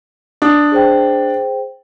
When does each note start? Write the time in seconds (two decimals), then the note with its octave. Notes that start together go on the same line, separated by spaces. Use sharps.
0.42 D4 D#6
0.72 G#4 C5 G5